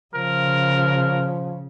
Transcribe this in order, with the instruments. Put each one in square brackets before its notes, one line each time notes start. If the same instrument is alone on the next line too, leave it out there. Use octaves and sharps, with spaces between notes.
[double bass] C#3 [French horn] F3 [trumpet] A#4